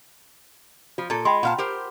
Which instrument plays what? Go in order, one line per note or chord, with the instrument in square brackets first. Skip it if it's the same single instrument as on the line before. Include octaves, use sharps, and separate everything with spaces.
[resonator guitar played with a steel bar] F3 [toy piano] F4
[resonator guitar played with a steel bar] A#2 A4
[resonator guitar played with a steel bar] G#3 [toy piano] G5 B5 C6
[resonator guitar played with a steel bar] A#2 F5 A5 [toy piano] F#5
[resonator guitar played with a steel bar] G4 A#4 C5